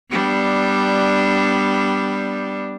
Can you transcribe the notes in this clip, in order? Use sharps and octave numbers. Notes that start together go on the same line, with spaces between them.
G3 B3 D4